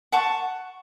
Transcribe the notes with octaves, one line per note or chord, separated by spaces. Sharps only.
F#5 A5 C#6